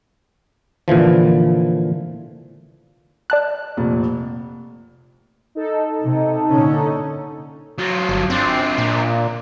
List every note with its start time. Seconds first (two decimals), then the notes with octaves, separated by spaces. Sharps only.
0.88 A#2 D3 E3 F3
3.30 D5 A5 F#6
3.77 F1 A#2
5.55 D#4 A4
6.01 C3
6.50 A#2 D3 C#4
7.78 F#3 F4
8.09 G1
8.30 C4 D4 F4
8.78 A#2